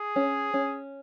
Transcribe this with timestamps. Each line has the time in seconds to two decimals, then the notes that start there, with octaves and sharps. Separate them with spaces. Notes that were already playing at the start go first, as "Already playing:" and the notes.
Already playing: G#4
0.16 C#4
0.54 C#4